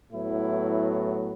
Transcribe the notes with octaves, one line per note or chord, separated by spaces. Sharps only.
A2 F#3 B3 E4